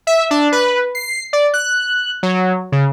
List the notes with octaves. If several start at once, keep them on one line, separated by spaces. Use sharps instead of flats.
E5
D4
B4
C7
D5
F#6
F#3
C#3